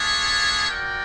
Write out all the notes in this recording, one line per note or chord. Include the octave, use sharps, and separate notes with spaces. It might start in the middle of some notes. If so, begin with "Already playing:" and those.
Already playing: A3 D4 F4 G#4 C#5
F#4 A#4 D5 G5